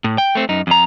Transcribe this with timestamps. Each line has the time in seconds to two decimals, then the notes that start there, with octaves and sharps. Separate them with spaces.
0.04 A2
0.18 G5
0.35 A3 C4
0.49 F#2 D#4
0.67 F2 A#5